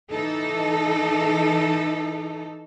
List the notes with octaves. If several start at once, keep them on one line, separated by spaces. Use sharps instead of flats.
E3 D#4 A4